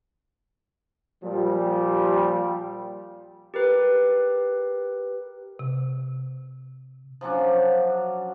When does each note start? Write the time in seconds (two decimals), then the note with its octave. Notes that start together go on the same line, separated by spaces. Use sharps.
1.23 A#2 F3 G3
3.54 G4 A#4 B4
5.59 C3
7.21 F3 F#3 C#4 D4